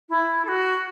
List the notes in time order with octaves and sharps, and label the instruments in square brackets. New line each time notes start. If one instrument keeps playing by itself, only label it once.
[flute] E4
A4
F#4